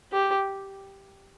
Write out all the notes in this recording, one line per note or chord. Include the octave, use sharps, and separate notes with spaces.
G4